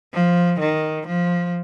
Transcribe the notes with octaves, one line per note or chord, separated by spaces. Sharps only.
F3
D#3
F3